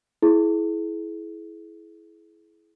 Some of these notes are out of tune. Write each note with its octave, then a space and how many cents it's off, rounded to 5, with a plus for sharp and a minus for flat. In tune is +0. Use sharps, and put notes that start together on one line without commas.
E4 +0 G#4 +30